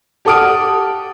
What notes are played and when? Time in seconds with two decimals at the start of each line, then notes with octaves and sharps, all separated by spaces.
0.25 G4 A4 F#5 D#6 F6 D7